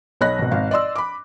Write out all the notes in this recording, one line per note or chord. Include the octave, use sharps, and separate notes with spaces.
B1 C#5 D#5 B5 F#6 A#6
G#1 B2
G#1 F5
D5 D#5 C6 E6
B5 D6